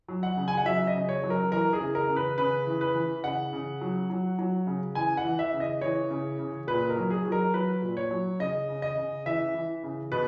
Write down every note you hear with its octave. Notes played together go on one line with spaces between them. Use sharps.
F#3
F#5
C#3
G#5
F#5
F#3 E5
D#5
C#3
C#5
F#3
A#4
E3 A#4
G#4
C#3
A#4
C#3
B4
C#3 B4
E3
B4
E3
C#3 F#5
C#3
F#3
F#3
F#3
C#3
E3 G#5
F#5
E3
E5
C#3
D#5
E3 C#5
C#3
C#3
A#2 B4
A#4
F#3
G#4
F#3
A#4
F#3 B4
A#2
C#5
F#3
C#3 D#5
C#3
D#5
C#3
E3 E5
E3
C#3
B2 B4